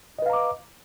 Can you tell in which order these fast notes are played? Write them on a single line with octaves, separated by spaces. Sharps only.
D#5 B4 F5 A#5 D6